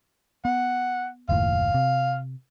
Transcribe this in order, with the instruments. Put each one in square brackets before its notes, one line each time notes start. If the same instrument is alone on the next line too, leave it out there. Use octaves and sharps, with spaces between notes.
[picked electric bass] B3 [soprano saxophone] F#5
[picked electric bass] F#1 D#2 A2 [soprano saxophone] F5
[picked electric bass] C3